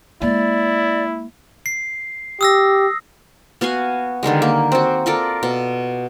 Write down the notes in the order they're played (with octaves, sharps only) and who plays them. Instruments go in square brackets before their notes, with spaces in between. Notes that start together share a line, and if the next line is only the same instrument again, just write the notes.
[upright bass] G#3 A#3 [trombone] E4 [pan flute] D5
[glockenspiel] C7
[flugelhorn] G4 [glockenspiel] D#6 E6 A#6
[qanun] B3 F#4 F5 G#5
D3 D#3 G3 G#3
A#3
C4 F#4
F4 A4 A#4 D5
B2